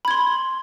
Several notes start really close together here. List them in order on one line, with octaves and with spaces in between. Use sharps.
B5 G#6 C6